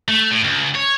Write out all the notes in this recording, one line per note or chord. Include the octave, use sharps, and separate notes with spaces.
A3
A2
C#2
C#5